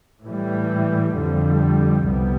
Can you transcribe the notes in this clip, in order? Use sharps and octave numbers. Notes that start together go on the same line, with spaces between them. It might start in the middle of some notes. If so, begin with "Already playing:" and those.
A2 E3 G3
F2 D3 G3
C2 C3 G3 B3